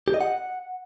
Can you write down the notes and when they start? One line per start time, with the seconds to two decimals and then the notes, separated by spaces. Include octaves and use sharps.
0.08 G4
0.14 D#5
0.21 F#5